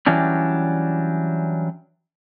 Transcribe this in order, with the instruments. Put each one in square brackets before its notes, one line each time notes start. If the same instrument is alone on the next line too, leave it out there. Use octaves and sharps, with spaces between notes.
[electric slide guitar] E3 F#3 G3 C#4 D4